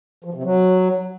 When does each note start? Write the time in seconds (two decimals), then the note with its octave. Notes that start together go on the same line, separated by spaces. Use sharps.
0.24 F3
0.34 C3
0.43 F#3